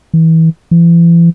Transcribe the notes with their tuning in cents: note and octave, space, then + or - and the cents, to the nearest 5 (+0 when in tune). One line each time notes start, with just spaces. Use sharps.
E3 -30
E3 +40